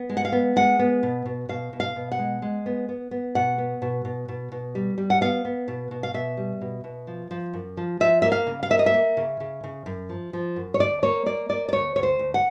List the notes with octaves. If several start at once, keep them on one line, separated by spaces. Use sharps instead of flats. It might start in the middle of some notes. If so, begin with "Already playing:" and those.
Already playing: B3
G#3
F#5
F5
B3
G#3 F#5
B3
B2
B2
B2 F5
B2
F5
B2
F#5
G#3
G#3
B3
B3
B3
B2 F#5
B3
B2
B2
B2
B2
G3
G3
F#5
B3 F5
B3
B2
B2
F5
B2 E5
G3
B2
B2
F3
F3
F#2
F3
F3 E5
A#3 E5
F5
C#3
F5
A#3 E5
D#5
E5
A#3
C#3
C#3
C#3
F#2
F3
F3
F#2
C#5
D2 D5
A#3 C#5
A#3 D5
A#3 D5
D5
D2 C#5
D2 C#5
C5
D2
F#5